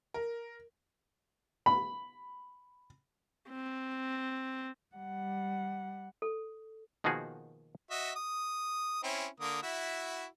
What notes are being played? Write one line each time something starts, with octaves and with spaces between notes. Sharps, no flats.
A#4
B5
C4
G3 F#5
A4
B2 D#3 F3 A#3 F#4 G#4
F#4 D#5 E5
D#6
C4 C#4 E4
D3 A#3 D#6
E4 F#4 E5